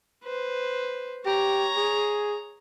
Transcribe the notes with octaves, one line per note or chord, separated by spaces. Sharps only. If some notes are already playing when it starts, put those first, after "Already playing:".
B4 C5
G4 C#5 A#5
G#4